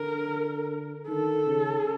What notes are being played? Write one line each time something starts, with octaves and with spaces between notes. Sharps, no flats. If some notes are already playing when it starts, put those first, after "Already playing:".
Already playing: D3 A#4
D#3 A4
C#3